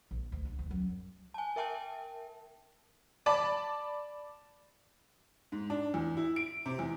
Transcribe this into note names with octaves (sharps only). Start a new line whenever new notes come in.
A#1
D2
D3
D2
F#2
G#5 A5
A#4 E5 G5 A5
D5 A5 B5 D6
G#2
D4
E2
E4
D7
C3
E2